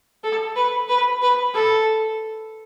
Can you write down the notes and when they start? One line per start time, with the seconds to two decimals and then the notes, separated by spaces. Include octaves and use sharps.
0.23 A4
0.56 B4
0.88 B4
1.21 B4
1.54 A4